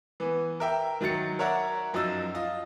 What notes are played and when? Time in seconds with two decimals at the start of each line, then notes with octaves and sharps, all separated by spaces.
0.20 E3 B3
0.60 A#4 E5 G5
1.01 D#3 F#3 A#5 A6 C#7
1.39 A#4 C#5 D5 E5 F#5 A#5
1.93 F#2 F3 F#3 D#4 E6 A6
2.34 F4 D#5